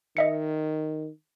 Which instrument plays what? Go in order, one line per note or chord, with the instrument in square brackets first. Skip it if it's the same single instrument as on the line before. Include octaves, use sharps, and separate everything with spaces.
[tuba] D#3 [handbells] D#5 E5 C#7